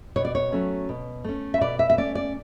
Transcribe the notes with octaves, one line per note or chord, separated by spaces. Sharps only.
B2 C#5
D5
C#5
F#3 A3 C#4
B2
A3 C#4
E5
B2 D5
E5
E5
A3 C#4 D5
D5